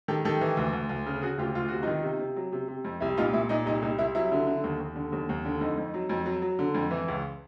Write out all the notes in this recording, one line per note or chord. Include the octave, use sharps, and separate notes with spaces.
D#3 G4 A4
D#3 G4 A4
E3
D2
D2
D2
C#3
C#3 F#4 G#4
D2 F4 G4
D2 F4
C3 F#4
D#3 D#4 F4
C3
C3
F#3
C3
C3
F2
C2 E4
A#2 D#4 F4
A#2 E4
A#2 D#4
C2 D#4
C2 D#4
C2 E4
F#3 E4
D3
D3
D#2
D#2
D3
D#2
D#2
D3
F2 D#4
F2
F#3
F2
F#3
F#3
D3
F2
E3
C#2